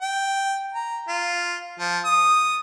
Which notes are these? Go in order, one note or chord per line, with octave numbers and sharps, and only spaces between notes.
G5
A#5
F4
F3
D#6